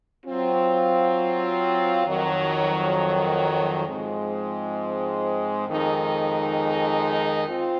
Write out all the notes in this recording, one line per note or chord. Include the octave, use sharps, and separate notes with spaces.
F#3 C4 F4
F2 D#3 F#3
G#2 F3 G#3 C4
F2 D#3 G#3 D#4
C4 F4